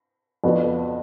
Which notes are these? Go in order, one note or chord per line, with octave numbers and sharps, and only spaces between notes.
F2 F3 B3 D4 F#4